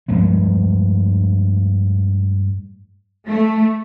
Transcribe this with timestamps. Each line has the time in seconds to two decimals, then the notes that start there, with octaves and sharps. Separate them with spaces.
0.08 G2 F3 G#3 A3
3.30 A3